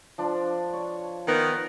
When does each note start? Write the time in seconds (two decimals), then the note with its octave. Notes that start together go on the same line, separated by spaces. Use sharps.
0.18 F3 D4 F4
0.73 C#5
1.27 D#3 B3 A#4